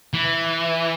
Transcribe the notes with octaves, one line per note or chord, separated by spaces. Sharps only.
E3